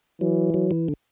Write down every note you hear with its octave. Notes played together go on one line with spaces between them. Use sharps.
E3 F#3
F#3
E3
D3